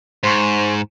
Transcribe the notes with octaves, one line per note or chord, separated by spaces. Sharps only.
G#2 C5 C6 C#6